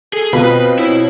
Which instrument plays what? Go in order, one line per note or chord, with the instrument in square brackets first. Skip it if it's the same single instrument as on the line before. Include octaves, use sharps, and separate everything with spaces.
[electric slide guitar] G#4 [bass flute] A4
[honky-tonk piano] B2 F4 B5 [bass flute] B3 [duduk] C4 [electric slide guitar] B4
[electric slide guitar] E4 [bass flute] C#5